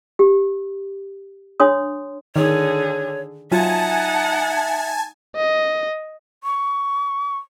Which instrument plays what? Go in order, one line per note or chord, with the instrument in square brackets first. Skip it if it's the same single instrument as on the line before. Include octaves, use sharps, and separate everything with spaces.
[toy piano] G4
D4 C#5 C6 D#6
[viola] D3 G#4 [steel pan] D#3 [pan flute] C#5
[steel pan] F#3 F4 [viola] D#4 F#5 [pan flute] E5 [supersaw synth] G#5 A5 G#6
[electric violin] D#5
[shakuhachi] C#6